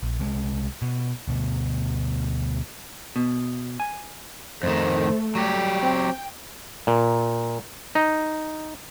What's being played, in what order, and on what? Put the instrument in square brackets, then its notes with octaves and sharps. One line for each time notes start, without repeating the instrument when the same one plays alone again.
[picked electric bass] A#1
C2 G3 G#3
B2
D2 B2
[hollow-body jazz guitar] B2
G#5
[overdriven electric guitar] F2 D#3 [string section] A3 [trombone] C5
[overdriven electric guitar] F#3 G4 [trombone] G3
[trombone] C4 [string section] G5
[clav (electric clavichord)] A#2
D#4